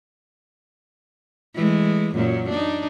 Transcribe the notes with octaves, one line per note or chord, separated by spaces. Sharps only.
E3 G#3 A3
F#2 A#2 F#3
D4 D#4